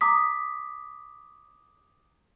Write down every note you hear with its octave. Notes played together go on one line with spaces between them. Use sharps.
A#5 D6 D#6 B6